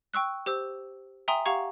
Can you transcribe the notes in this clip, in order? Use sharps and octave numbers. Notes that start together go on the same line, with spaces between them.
G5 C#6 E6 F#6
G4 C5 E6
E5 G5 G#5 A#5 C6 D#6
G4 F5 F#5 A#5 C#6 G#6